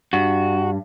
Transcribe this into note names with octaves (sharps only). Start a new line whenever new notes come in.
G2 F#4